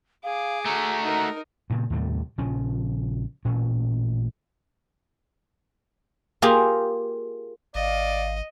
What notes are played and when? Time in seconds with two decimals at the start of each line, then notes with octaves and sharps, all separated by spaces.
0.24 G#4 F5 D6
0.65 A3 F#4 A#5
1.01 D#4 A#4
1.70 G2 A#2 C#3
1.90 D#2 A2 C3 G3
2.38 A#1 C#3 F3 C#4
3.45 A1 A#2 C#4
6.42 A#3 F4 G4 G#4 A#4
7.75 G#1 D5 D#5 F5